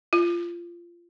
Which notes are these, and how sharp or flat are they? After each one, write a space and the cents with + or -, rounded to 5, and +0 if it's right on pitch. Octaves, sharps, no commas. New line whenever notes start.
F4 -20